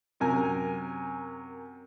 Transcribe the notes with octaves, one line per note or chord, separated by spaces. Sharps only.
F#2 C3 A#4 G#5